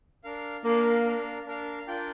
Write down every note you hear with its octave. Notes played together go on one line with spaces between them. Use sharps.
D4 A#4 F5
A#3 D4 A#4 F5
D4 A#4 F5
D4 A#4 F5
D4 F4 A#4 D5 G5